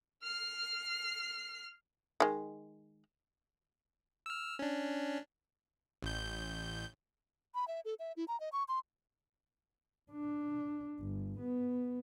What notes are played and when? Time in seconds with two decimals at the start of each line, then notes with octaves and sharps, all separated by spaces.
0.23 F6 C7
2.20 D#3 G#3
4.26 E6 F6
4.59 C#4 D4
6.03 A1 G6
7.55 B5
7.68 E5
7.85 A4
7.99 E5
8.17 E4
8.28 A#5
8.40 D#5
8.53 C#6
8.68 C6
10.12 D4
11.00 G1
11.40 B3